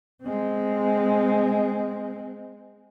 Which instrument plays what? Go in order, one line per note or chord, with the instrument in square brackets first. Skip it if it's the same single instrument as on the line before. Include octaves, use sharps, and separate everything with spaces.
[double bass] G#3 C4